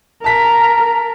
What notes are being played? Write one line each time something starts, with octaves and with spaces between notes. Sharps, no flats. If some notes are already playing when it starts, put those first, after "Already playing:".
A#4 A5 B6